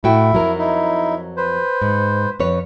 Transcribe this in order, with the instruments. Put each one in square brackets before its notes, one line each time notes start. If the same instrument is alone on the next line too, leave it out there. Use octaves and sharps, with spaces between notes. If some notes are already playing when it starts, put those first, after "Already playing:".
[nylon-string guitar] A2 F#4 G5 [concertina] E4
[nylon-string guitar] F2 F#3 A#4
[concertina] D#4 E4
B4 C5
[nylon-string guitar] G#2
F2 B4 C#5